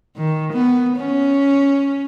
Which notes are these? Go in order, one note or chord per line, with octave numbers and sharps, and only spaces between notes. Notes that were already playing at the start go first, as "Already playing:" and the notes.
D#3
B3
C#4